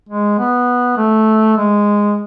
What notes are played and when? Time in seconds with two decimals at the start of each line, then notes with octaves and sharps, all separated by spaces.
0.09 G#3
0.39 B3
0.97 A3
1.57 G#3